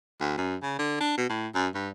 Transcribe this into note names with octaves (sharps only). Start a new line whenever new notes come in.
D2
F#2
C#3
D3
D4
B2
A2
F#2
G2